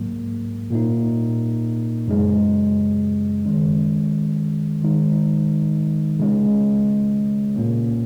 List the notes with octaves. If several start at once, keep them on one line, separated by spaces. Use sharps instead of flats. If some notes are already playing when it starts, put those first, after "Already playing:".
Already playing: G#2 F#3 A#3
A#2 A#3 D#4
F#2 C#3 G#3
D#3 G#3 C#4
D#3 G#3 D#4
C#3 G#3 C#4
A#2 A#3 C#4